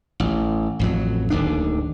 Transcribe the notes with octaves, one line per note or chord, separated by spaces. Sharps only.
A1
A1 F2 F#3
D1 D#2 D4